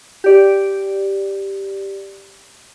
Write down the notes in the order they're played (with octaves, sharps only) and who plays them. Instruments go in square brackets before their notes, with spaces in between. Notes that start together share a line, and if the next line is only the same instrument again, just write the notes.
[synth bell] G4 D5